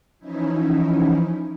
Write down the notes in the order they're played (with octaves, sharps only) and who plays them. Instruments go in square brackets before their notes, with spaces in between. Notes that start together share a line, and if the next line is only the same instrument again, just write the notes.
[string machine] E3 F3 C#4 D#4 E4